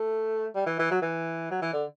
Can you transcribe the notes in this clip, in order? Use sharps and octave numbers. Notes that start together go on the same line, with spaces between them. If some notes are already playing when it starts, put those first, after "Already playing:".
Already playing: A3
G3
E3
E3
F#3
E3
F#3
E3
D3